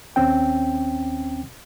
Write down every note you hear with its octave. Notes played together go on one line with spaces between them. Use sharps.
D#2 C4 C#4 G5